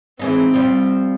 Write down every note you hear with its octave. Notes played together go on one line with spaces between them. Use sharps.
E3 G#3 C4 D#4
F3 G3